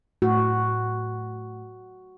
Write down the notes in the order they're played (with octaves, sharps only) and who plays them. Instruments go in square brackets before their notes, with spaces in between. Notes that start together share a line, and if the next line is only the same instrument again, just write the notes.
[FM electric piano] A2 [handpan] F#4